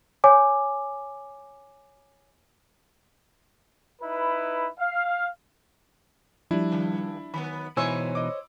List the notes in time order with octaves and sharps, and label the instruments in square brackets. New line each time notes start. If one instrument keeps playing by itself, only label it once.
[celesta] C#5 G#5 D6
[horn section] D#4 E4 B4
F5
[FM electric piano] F3 G3 [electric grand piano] D4 E4
[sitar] G2 D#3
[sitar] D#3 F#3 B3 [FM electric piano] B5
[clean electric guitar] B2 E3 D#4 [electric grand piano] E4 G#5 E6 [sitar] C5 C#5
[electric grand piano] D#5 D6